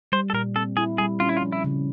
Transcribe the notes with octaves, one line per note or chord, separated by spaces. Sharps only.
G3 C5
A4
A#2 A#4
C4 A4
E4 G#4
G3 G#4
C#4 F4
E4
F4
F3
E4
C#3